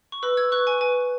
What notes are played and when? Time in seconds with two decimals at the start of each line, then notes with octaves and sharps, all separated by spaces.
0.12 C#6
0.22 B4 B5 E6
0.37 E6 G#6
0.52 B4 C#6 F#6
0.67 G#5 C#6
0.81 B4 G#5